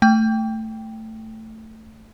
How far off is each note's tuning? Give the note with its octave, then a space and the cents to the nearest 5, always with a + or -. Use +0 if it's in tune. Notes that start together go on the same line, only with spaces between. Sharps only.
A3 +10 G5 +0